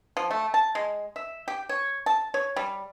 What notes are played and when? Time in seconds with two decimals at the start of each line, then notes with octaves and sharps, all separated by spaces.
0.17 F3
0.31 A3
0.54 A5
0.75 G#3
1.16 E5
1.48 G4
1.69 C#5
2.06 A5
2.34 C#5
2.56 G3